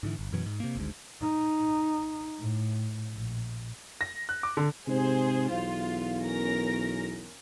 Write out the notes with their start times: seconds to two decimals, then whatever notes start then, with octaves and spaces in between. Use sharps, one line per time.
0.03 G#2 D3 E3
0.19 G1
0.32 F#2 B2 E3 F#3
0.46 G#2
0.60 C3 A#3
0.75 G#1 D2 G#2
1.22 D#4
2.38 A2
3.13 A#1
4.01 A#6
4.29 F#6
4.43 D6
4.57 D3
4.88 G#2 C3 G#4 C5
5.51 B1 E2 F4
6.24 C#4 A#4 A#6